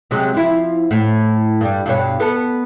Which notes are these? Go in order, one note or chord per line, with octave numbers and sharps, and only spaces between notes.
C3 F#3 G#3
F3 E4
A2
G2 G3
G2 B2 C#5
B3 A4